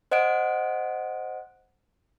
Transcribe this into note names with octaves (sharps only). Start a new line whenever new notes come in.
C5 D#5 F#5 F#6 D7